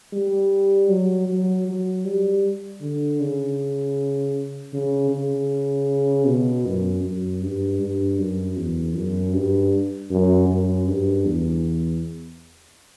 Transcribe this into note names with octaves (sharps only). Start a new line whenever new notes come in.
G3
F#3
F#3
F#3
G3
D3
C#3
C#3
C#3
B2
F#2
F#2
G2
G2
F#2
E2
F#2
G2
F#2
F#2
G2
E2